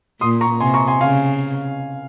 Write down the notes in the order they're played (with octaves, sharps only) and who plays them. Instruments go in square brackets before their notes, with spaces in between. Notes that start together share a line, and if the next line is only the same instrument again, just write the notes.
[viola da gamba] A#2 [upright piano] C6 D#6
[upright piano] A#5 C#6
[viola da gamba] C3 [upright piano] G#5 C6
[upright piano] A#5 C#6
G#5 C6
[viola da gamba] C#3 [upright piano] F5 G#5